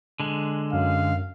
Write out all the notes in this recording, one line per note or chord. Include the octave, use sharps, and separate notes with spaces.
D3 G#3
F#2 F5